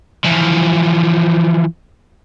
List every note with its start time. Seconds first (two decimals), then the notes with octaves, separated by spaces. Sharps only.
0.24 E3 F3